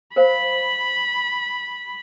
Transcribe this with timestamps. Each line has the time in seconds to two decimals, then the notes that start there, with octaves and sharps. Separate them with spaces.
0.16 A#4 C5 F5 B5